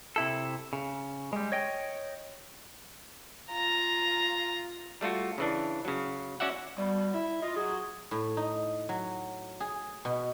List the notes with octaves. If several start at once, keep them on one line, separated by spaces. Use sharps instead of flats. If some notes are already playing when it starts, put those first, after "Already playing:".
C3 E4 A4
C#3
G3 G#3
C#5 D#5 G5
F4 A#5
G3 A3 F4 F#4
C#3 E3 D4
C#3 F#3
C#4 F#4 D5 E5 F#5
B2 G3
E4 E5
F4 D#5
F#3 G#4
A2
D#4
F#3
G#4
B2